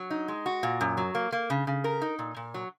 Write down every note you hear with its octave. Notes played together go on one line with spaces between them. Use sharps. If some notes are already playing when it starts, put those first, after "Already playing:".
Already playing: F#3
D#4
G#3
F#4
A#2
F#2
F#3
A#3
A#3
C#3
C#3
A#4
D#4
A#2
A#2
F#3